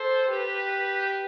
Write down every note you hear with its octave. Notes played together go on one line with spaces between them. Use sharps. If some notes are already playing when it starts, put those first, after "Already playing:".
Already playing: A4 C5
G4 B4